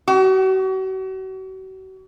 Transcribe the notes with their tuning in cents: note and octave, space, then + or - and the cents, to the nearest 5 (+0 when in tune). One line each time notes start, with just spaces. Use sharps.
F#4 +40